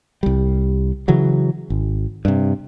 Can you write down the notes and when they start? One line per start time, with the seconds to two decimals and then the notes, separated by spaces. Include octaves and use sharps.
0.23 C2 G3
1.08 C#3 E3 F#3
1.70 G#1
2.25 G2 C3